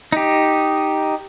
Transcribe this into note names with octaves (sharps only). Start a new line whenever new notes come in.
D#4 G4